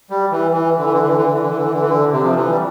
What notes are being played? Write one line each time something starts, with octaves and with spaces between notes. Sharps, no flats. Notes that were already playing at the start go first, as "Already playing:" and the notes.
G3
E3
E3
D3
E3
D3
E3
D3
E3
D3
E3
D3
E3
D3
E3
D3
E3
D3
C3
F3
E3
G3